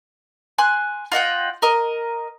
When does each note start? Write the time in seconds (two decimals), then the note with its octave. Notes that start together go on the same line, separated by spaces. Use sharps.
0.58 G#5 C6 F#6
1.12 F4 D#5 F#5 G5
1.62 A#4 D#5